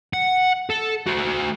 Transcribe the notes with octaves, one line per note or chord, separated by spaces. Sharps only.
F#5
A4
A3 F#4